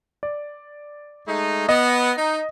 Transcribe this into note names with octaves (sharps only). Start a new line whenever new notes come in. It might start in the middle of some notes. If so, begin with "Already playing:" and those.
D5
G#3 A3 D#4
B3 D#5
D#4